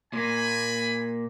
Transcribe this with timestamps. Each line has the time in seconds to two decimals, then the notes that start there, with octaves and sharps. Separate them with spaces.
0.13 A#2 A#3 G#5 B5